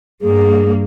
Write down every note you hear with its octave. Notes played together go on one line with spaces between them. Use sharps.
G2 A#3 G#4